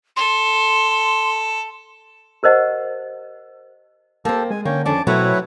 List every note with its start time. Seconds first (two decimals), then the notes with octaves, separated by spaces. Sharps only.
0.16 A4 C6
2.43 G4 A#4 C5 D#5 F#5
4.25 A#3 C4 G4 A4 A5
4.50 G#3 G#5
4.66 D3 A#3 C#4 C#5 G5
4.86 F2 C#4 D4 A5 D6
5.07 B2 F#3 A3 C4 E4 B4 C#5